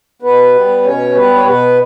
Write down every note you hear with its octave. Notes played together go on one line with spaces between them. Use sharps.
B2 B3 B4
G3
B2 C#4 C#5
G3 B3 B4
C#5
B2 B3 B4